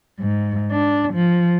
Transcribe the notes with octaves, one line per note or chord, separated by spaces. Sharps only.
G#2
D4
F3